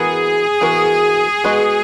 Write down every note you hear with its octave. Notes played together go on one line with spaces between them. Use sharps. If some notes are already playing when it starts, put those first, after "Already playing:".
Already playing: E3 B3 F#4 G#4 A#4
E3 B3 F#4 A#4
G#3 B3 F#4 B4 D#5